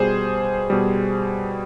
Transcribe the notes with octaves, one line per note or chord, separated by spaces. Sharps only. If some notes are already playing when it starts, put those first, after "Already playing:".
Already playing: B2 G3 G#4 C5
B2 G3